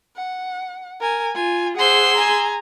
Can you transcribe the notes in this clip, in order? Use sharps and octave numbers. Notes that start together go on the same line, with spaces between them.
F#5
A#4 G#5
F4 G#5
G#4 C5 F#5 C6 E6
G#5 A#5